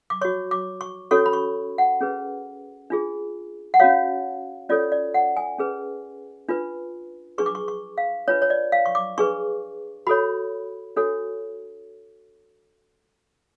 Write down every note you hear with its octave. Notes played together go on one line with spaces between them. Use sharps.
D6
F#4 C#5 C#6
D6
C#6
C#4 F#4 A4 C#5 C#6
B5
C#6
F#5
C#4 G#4 B4
D4 F4 G#4
F#5
C#4 F#4 C#5 F5
C#4 F4 A4 C#5 D5
D5
F#5
G#5
C#4 G#4 B4
D4 F4 B4
D4 G#4 B4 C#6
D6
C#6
C#6
F5
D4 F4 B4 C#5
C#5
D5
F5
C#6
D6
D4 G#4 B4 C#6
F#4 A4 C#5 B5
D4 F#4 A4 C#5